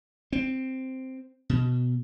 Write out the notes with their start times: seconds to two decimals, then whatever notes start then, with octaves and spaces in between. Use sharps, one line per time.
0.33 C4
1.50 B2